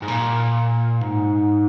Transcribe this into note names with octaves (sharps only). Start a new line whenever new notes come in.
G#2
A#2
G#2